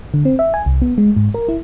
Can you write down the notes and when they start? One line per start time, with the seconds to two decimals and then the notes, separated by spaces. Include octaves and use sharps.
0.14 D3
0.25 C4
0.39 E5
0.54 G#5
0.66 C2
0.82 B3
0.98 G#3
1.16 G#2
1.34 A#4
1.48 E4